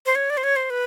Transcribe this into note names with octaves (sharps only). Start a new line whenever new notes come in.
C5
C#5
D5
C5
C#5
C5
B4